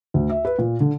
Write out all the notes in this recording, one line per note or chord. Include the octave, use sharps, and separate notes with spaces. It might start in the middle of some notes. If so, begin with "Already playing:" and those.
D2
E5
B4
A#2
D3